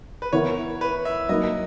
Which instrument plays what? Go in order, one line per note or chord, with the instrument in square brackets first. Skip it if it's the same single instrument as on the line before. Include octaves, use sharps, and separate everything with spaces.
[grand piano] B4
[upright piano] E3 B3 E4 A#4 [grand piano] C#5
[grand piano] B4
E5
[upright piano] F#3 A#3 D#4 [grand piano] D#5